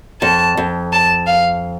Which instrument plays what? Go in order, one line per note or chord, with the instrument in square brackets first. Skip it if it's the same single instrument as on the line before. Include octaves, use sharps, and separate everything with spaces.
[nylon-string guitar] F2 [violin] A5
[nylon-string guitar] F2
[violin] A5
F5